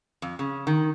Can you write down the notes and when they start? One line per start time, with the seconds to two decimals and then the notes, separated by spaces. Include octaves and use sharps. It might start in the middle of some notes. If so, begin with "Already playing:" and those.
0.22 F2
0.39 C#3
0.67 D#3